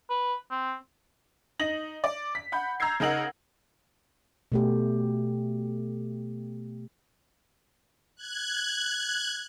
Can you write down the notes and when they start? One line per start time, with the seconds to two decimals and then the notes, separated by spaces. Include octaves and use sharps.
0.10 B4
0.51 C4
1.59 D#4 A#6 F#7
2.04 D5
2.35 B6
2.52 F#5 B5 G6
2.80 A#5 E6 G6 G#6 C7
3.00 C#3 D#4 A#4 F#5 F#7
4.52 B2 A3 G4
8.15 F#6 G#6